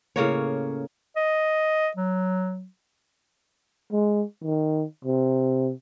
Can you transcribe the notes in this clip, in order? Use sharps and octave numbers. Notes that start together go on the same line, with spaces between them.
A2 C#3 A#3 C#5
D#5
F#3
G#3
D#3
C3